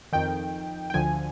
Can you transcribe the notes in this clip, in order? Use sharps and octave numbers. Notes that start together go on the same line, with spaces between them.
F2 D#3 G5
G5
D2 D3 F3 G#5